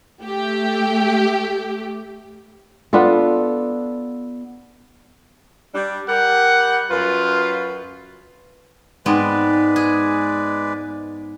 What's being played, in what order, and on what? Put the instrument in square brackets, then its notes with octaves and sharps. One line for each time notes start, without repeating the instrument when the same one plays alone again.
[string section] A3 G4
[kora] B3 D4 F4 A4
[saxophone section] G3 D4
[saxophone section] G3 G4 A#4 [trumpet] F#5
[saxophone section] F#2 B4 [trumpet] F4
[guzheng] G#2 B3 C4 [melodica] G#3 B4 D5
[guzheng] G#4